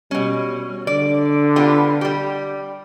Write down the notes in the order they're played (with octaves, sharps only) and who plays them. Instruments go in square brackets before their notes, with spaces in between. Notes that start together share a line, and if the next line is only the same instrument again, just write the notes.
[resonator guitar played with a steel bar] B2 C#4 [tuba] G3
[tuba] D3 [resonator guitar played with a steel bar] D5
[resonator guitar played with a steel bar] G3 B3 F4
G3 G4